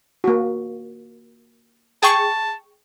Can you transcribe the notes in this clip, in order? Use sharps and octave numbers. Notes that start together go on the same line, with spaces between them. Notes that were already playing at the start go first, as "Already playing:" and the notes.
A#3 F#4
G#4 G5 A5 C#6